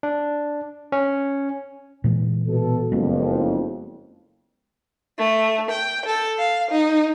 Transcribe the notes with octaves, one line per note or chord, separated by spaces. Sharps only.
D4
C#4
A#2 E3 G#3
B2 A4
F#1 F2 G#3 B3 C#4
A3
G5
A4
F5
D#4